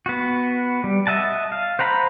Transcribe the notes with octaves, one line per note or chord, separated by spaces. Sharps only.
B3 F#4
G3
D#5 E5 F#5 A5
F5
C5 F#5 A#5 B5